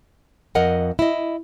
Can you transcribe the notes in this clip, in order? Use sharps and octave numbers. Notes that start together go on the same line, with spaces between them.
F2 A#4 D#5 F#5 G#5
E4 D#5